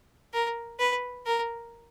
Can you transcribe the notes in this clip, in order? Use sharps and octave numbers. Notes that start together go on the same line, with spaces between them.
A#4
B4
A#4